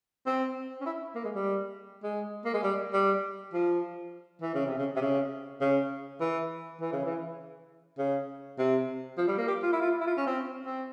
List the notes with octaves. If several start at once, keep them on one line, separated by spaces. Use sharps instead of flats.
C4
C#4
E4
A#3
G#3
G3
G#3
A#3
G#3
G3
G3
F3
E3
C#3
C3
C#3
C3
C#3
C#3
E3
E3
C#3
E3
C#3
C3
F3
G3
A#3
G4
F4
E4
F4
E4
F4
C#4
C4
C4